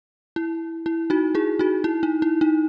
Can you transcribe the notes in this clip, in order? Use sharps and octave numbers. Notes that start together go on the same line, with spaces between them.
E4
E4
D#4 F#4
E4 G#4
D#4 F#4
E4
D#4
E4
D#4